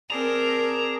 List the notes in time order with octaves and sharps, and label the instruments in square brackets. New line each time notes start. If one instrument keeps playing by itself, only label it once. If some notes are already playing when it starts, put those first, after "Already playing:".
[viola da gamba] C4 A#4 [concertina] G#4 D5 A5 [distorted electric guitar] A#5